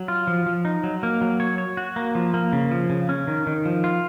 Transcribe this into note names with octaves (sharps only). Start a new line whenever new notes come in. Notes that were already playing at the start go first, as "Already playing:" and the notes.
Already playing: F#3
F4
F3
F3
D#4
F#3
A#3
F#3
C#5
C#5
F#4
A#3
F3
A#3
C#3
F3
C#3
C#4
D#3
D#3
F3
F4